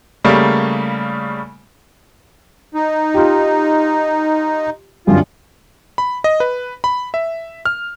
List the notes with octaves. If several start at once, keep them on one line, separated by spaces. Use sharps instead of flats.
C#3 G3 A3 A#3
D#4
F4 G4
C2 F#2 D3 F4
B5
D#5
B4
B5
E5
F6